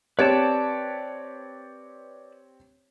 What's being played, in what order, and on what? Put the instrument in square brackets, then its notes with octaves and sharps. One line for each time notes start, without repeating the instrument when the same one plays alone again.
[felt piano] C4 G4 C#5 [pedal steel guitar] B4 D5 A5